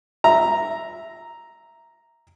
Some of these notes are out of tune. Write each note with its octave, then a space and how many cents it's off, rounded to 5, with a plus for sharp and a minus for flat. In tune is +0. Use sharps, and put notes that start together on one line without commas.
E5 +0 A#5 +0